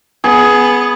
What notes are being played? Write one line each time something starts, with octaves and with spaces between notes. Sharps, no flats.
B3 G#4